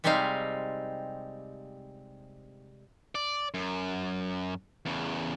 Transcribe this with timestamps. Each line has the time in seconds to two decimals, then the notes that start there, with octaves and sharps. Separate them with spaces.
0.04 C3 G3 G#3 C4 D#4 F5
3.15 D5
3.54 F#2
4.85 E2 C#3